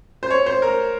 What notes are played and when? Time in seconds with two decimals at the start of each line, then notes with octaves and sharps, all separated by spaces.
0.23 C5
0.30 C#5
0.46 C5
0.62 A#4